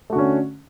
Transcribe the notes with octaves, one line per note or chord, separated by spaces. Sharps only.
D3 A3 C#4 F#4